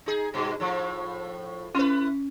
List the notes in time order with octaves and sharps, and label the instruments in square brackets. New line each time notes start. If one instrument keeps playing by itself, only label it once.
[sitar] D#4 G#4
G2 B2
A2 F3
[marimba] C#4 [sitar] E4 B4